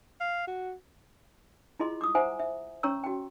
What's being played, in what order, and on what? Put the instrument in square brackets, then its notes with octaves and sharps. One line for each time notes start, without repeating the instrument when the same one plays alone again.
[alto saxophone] F5
F#4
[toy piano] E4 F4 G#4 D#5 C6
D6 D#6
C5 E5 F#5 G#5 A#5
E5
C#4 C#5 A#5 C#6 E6
F#4 G5